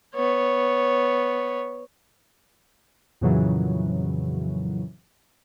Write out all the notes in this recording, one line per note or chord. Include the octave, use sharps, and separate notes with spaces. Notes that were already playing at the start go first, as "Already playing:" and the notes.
B3 C#5
F2 A#2 C#3 E3 F#3